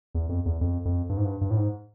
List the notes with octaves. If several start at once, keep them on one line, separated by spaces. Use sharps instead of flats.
E2
F2
E2
F2
F2
G2
G#2
G2
G2
A2
G#2